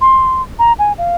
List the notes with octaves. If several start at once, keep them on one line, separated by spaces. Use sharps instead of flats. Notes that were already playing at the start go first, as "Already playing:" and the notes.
C6
A#5
G#5
F5